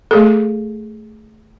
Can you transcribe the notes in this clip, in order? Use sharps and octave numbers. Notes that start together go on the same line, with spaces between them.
A3 G#4 A4